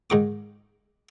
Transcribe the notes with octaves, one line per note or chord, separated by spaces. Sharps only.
G#2 D#3 D6